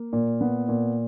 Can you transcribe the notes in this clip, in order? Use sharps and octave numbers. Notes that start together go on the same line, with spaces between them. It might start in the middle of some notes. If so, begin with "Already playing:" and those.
Already playing: A#3
A#2
B3
A#2